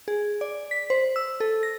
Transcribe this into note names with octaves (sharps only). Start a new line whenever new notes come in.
G#4
D5
B6
C5
E6
A4
A#6